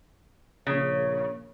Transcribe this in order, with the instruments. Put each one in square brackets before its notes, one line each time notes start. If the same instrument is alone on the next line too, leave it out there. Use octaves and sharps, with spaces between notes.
[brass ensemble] A#1 A#3 C#5 [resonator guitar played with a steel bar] C#3